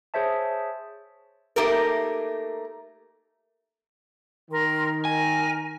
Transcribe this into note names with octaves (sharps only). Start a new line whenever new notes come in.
G#4 C5 C#5 E5 A5
A3 A#3 D#4 G4 A4 A#4
D#3 A#4 C6
A#4 G#5